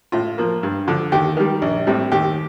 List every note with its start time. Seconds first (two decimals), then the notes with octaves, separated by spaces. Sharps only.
0.12 A2 F4
0.38 F3 A#3
0.63 G2
0.88 D3 F3
1.12 D#2 G4
1.37 D#3 G3
1.62 A#1
1.87 A2 G3 C4
2.12 D#2 G4